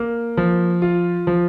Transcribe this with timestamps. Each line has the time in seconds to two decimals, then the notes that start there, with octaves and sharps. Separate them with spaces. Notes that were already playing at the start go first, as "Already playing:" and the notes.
Already playing: A#3
0.37 F3
0.82 F4
1.27 F3